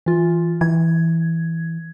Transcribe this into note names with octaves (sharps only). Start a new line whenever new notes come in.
E3 F4
E3 G#6